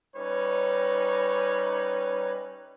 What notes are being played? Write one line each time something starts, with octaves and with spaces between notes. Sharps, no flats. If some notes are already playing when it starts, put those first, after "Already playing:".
G3 C#4 D#4 B4 C#5